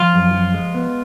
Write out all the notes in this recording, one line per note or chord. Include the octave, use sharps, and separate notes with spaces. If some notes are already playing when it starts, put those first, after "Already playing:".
Already playing: F3 F4
F#2
F3
G#3
B3